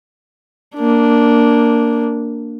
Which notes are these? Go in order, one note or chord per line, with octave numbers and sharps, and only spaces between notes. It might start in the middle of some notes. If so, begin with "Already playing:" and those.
A#3 D4